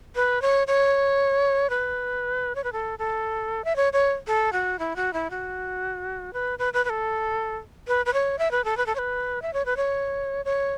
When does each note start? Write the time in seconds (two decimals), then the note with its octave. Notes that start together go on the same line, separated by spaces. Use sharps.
0.15 B4
0.42 C#5
0.67 C#5
1.70 B4
2.55 C#5
2.64 B4
2.73 A4
2.99 A4
3.65 E5
3.76 C#5
3.93 C#5
4.27 A4
4.53 F#4
4.79 E4
4.96 F#4
5.13 E4
5.30 F#4
6.33 B4
6.59 B4
6.73 B4
6.85 B4
6.90 A4
7.87 B4
8.06 B4
8.13 C#5
8.39 E5
8.51 B4
8.65 A4
8.77 B4
8.86 A4
8.95 C#5
8.98 B4
9.42 E5
9.53 C#5
9.66 B4
9.77 C#5
10.45 C#5